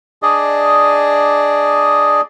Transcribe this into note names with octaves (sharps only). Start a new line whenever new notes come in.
D4 G#4 D5 D#5